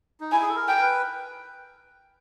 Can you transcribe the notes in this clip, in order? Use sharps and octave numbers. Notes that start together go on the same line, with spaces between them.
D#4
E4 G#5
G#4
A4
A#4
G5
A#4
B4